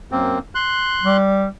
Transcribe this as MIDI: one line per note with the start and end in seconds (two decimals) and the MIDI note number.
0.12 0.39 42
0.12 0.39 58
0.12 0.39 60
0.55 1.17 84
0.55 1.17 90
1.03 1.47 55